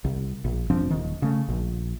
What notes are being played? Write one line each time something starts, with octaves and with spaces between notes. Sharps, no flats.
C2
A#1
F1 F3 C4 D4
D#1 D#3
C#3 A3
A#1